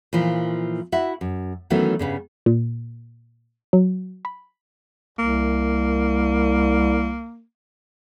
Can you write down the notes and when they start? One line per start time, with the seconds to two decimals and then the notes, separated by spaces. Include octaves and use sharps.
0.13 A#2 E3 F3
0.92 E4 F#4 E5 F#5
1.21 F#2
1.70 D#3 E3 F#3 A3 B3 C#4
1.99 G2 C#3 B3
2.46 A#2
3.73 F#3
4.25 B5
5.19 C2 A#3